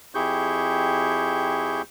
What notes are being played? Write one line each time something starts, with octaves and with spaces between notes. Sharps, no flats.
F2 E4 G4 G#4 C#6 G6